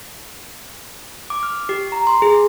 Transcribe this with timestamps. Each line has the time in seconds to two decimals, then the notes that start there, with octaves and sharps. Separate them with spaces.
1.30 D6
1.43 F6
1.69 G4
1.92 A#5
2.07 C6
2.22 G#4